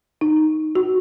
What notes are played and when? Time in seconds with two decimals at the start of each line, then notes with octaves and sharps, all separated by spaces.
0.21 D#4
0.76 F#4